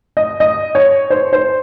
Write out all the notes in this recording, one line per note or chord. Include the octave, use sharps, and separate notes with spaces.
D#5
D#5
C#5
C5
C5